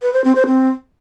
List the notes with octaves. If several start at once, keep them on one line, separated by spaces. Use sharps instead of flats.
B4
C5
C4
C5
C4